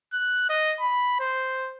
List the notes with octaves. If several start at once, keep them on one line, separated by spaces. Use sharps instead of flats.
F#6
D#5
B5
C5